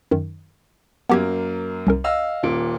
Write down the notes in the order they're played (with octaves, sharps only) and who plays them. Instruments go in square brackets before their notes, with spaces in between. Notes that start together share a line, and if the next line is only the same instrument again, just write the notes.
[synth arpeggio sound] F#2 D#3
[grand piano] F#2 A#3 [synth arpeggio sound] B3 G4 G#6
[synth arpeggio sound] C2 C#4 A#4
[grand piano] D#5 F5 E6
D#1 A#2 D7